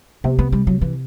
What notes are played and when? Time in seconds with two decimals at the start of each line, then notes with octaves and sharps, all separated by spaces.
0.24 C3 B3
0.39 B3
0.52 G3
0.67 F#3
0.82 E3